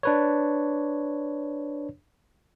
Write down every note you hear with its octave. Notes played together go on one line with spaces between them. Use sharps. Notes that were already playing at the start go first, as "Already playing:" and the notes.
D4 B4 C#5